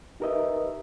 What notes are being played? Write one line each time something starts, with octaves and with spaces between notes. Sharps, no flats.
D#4 G4 A#4 B4 D#5 E5